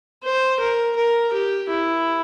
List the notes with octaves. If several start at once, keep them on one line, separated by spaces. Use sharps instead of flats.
C5
A#4
A#4
G4
E4